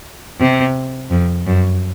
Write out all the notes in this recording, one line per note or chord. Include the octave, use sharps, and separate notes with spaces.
C3
F2
F#2